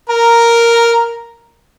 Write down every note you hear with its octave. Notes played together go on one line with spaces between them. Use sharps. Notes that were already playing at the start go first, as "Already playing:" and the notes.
A#4 A#5